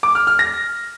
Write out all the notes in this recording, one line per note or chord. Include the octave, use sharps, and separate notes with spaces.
D6
F6
F6
A#6